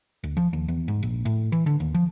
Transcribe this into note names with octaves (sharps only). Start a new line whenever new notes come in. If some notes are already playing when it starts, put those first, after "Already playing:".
D2
F3
D#2
E2
G#2
A#1
A2
E3
D3
D#2
F3